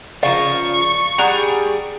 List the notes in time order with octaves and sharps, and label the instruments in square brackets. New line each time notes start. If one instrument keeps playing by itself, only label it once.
[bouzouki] C#3 F3 A#4 [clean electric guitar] D5 F5 [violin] C#6
[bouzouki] G3 D4 G#4 [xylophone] F#5 A#5 F#6